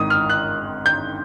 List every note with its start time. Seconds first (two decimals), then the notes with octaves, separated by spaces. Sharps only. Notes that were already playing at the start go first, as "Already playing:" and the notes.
Already playing: G#1 G#2 D#3 D#6
0.10 F6
0.29 F#6
0.86 G6